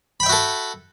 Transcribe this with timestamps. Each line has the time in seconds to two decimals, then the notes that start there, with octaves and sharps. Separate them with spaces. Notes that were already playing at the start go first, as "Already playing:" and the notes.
0.20 B5
0.23 G5
0.26 E5
0.29 F#4
0.32 A4